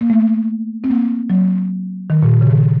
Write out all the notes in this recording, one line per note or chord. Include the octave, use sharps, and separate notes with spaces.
A#3
A3
C4
A#3
F#3
D#3
A#2
C#3
D#3